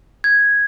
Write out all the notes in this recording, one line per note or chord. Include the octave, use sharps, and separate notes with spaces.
G#6